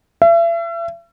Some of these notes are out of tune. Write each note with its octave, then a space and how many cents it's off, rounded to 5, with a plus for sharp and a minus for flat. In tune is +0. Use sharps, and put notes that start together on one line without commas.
E5 +40